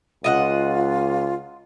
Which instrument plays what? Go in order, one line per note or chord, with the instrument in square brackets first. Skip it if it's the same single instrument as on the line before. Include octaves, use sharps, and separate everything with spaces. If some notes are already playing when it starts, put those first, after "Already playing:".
[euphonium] C#2 [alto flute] F4 [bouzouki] D#5 E5 F#5